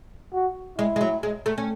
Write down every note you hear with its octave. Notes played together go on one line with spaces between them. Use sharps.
F#4
G#3 E4
G#3
F#3
G#3
A3
C#4